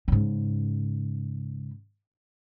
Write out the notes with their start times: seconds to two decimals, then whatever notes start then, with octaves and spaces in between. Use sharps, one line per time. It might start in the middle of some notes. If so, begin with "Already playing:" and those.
0.08 G#2 C#3